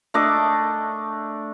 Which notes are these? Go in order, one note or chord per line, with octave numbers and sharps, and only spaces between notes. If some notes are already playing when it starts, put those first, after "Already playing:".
A3 D4 D#5 D6